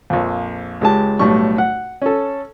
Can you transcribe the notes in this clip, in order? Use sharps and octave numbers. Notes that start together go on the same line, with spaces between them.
A#1 F2
C#2 G#3 G4 A5
B1 A2 G3 C#6
F#5
C#4 A4